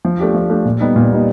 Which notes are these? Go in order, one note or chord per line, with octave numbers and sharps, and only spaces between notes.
F3
A3 D4 G4
F3
A3 D4 G4
A#2
G3 B3 D#4
A#2
G3 B3 D#4